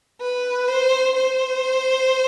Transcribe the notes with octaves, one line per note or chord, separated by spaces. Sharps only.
B4
C5
C5